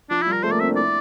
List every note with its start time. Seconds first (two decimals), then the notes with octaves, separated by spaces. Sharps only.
0.10 F3 D4
0.22 G3 E4
0.32 A#4
0.43 A3 C5
0.51 A#3 D5
0.60 C4 E5
0.68 D4
0.76 E4 D5